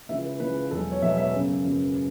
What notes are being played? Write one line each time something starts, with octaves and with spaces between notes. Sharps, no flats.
C#2 C#3 E3 E5
B4
C#2 C#3 E3 B4
E1 E2 B2 F#3 A4
C#5
E1 E2 B2 F#3 E5
E5
F#2 C#3 F#3 B3
F#2 C#3 F#3 B3